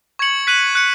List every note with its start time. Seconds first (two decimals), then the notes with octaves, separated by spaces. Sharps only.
0.19 C#6 G#6 C#7 F#7
0.47 F#6 B6 D#7 F#7
0.75 F#6 C#7